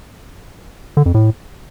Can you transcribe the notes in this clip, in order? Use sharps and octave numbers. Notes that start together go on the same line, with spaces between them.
D3
F2
A2